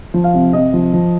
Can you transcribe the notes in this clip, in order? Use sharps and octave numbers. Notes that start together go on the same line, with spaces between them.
F3
F5
C3
C3 D#5
F3
F3